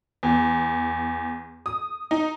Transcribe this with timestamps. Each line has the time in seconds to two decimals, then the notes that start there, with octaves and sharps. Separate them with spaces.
0.23 E2
1.66 D#6
2.11 D#4